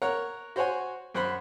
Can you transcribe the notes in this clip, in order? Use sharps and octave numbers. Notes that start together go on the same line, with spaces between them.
A#4 C#5 F#5
F#4 C5 C#5 F#5 G#5
F#2 C5 F#5 B5